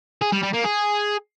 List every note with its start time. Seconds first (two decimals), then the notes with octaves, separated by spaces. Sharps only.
0.22 G#4
0.32 G3
0.43 G3
0.54 A#3
0.65 G#4